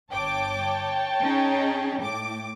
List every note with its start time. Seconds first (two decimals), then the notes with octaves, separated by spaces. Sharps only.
0.11 G1 C#5 G5 A5 D6
1.21 C#4 D#4 G#4
2.01 A2 D6